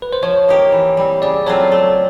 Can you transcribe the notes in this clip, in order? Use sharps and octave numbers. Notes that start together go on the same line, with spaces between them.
B4
C5
F3 C#5
A#3 D#4 G4 A#4
E3
G3 C4
C#3 D5
F#3 A3 C4 F4 C#5
A3